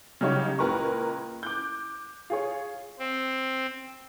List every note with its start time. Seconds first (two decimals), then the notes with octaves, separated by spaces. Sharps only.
0.21 C#3 F#3 G3 D#4 G4 C#5
0.59 C#2 A#2 A#4 B4 A#5 C#6
1.43 D6 F#6 G6
2.30 F4 G#4 C#5
2.99 C4